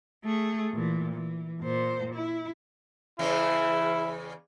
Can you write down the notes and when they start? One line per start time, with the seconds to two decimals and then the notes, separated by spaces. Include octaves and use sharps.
0.24 A3 G#4
0.72 A#2 E3
1.14 E3
1.61 A#2 C5
2.14 E4
3.19 E2 C#3 G#3 E4